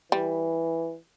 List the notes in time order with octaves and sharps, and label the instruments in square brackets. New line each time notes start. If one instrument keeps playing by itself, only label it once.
[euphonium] E3 [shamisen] G3